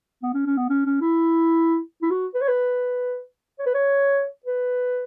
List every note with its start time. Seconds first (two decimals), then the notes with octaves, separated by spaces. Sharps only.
0.23 B3
0.34 C#4
0.46 C#4
0.57 B3
0.70 C#4
0.86 C#4
1.01 E4
2.02 E4
2.11 F#4
2.35 B4
2.42 C#5
2.49 B4
3.59 C#5
3.66 B4
3.74 C#5
4.46 B4